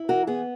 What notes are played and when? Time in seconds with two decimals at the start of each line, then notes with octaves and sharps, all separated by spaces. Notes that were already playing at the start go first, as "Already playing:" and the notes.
Already playing: E4
0.08 E3 F#4 A#4
0.27 B3 G#4